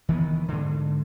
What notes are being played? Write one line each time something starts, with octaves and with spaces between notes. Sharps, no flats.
D#3 E3 A3 B3
G#2 D3